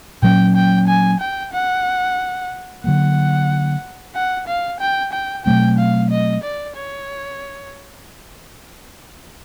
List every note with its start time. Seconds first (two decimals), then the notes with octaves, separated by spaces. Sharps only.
0.22 A#2 F#3 A#3 C#4 G5
0.56 G5
0.88 G#5
1.20 G5
1.53 F#5
2.84 D3 F#3 A#3 F#5
4.15 F#5
4.48 F5
4.80 G5
5.13 G5
5.46 B2 F#3 A3 C4 G5
5.78 F5
6.11 D#5
6.44 D5
6.76 C#5